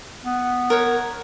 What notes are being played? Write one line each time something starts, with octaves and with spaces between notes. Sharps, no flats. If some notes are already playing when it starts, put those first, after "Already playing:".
B3
A#4 C#5 F#5